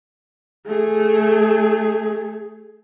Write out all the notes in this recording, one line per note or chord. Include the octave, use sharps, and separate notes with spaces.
A3 G#4